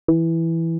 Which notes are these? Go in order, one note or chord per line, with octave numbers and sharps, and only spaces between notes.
E3